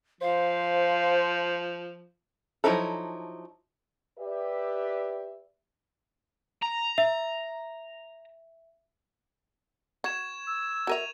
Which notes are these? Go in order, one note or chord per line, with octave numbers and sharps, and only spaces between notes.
F3 C5 F5
F3 F#3 D#4 E4 A4
G4 B4 D5 E5
A#5
E5
F#4 C#6 G#6 E7
E6
F#4 A#4 E5 G#6 D#7 F7